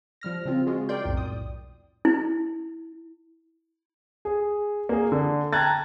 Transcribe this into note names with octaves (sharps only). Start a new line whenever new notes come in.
F3 G3 F6 A#6
C#3 F3 C4 F4
G#3 F4 F#4 G#4
A#4 D5 G5 C6 G6
B1 F2 A2
D#6
E4
G#4
A#3 G#4
D3
G5 A5 A#5 F#6 G#6 A6